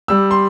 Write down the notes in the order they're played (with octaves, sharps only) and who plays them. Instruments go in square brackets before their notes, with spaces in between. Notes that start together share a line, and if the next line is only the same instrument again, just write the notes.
[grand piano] G3 E6
C6